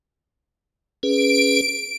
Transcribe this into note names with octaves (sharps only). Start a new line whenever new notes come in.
C#4 G#4 B4 D7